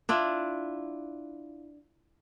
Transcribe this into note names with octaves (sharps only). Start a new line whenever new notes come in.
D4 E4 F4